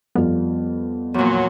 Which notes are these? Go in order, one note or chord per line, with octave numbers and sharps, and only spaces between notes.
F2 G3 B3 F4
E2 A#2 F#3